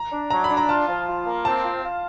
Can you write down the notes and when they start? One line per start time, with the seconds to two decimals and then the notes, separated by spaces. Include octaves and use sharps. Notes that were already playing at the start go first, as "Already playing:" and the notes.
Already playing: A#5
0.12 D4
0.30 F#3 A#5
0.44 B5
0.50 D4
0.57 A#5
0.69 F4 A5
0.88 F3
1.08 F4
1.26 A#3
1.45 C4 A5
1.64 F4
1.83 F4